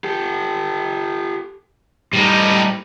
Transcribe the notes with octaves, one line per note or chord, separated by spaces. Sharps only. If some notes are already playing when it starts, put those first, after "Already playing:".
G4 A4
A2 G3 D#4